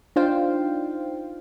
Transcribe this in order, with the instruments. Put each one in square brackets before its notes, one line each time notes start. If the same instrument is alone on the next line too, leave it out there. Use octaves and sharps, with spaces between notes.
[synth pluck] D4 D#4 F4 C5 F5 G5